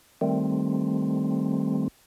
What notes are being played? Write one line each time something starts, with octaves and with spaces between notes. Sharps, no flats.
D#3 G3 A3 C4